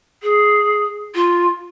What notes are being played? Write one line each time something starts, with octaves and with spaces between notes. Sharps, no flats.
G#4
F4